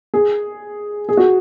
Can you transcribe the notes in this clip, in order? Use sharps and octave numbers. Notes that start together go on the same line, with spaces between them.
G#4
G#4
F#4